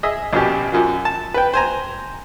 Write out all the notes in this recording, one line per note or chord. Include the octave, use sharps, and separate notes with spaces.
G#4 D#5 E5
A#1 B2 C#4 G4
F#2 F3 F#3
A5
B4 G5
C5 G#5 A#5